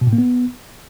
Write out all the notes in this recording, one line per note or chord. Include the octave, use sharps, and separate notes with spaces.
B2
A2
A#3
B3